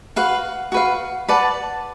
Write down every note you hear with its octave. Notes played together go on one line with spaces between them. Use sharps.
F#4 B4 F5
F#4 B4 F5
B4 D5 F#5 A5